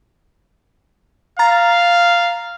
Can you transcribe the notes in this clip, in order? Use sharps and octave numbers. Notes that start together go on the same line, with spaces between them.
F5 A#5 A6